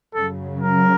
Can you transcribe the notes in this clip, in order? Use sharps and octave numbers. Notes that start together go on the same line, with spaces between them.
F#2 C#3 F#3 A4
A#4